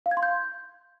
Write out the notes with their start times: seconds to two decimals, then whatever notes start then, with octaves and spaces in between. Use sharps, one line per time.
0.06 F5
0.11 G#6
0.17 C6
0.23 G6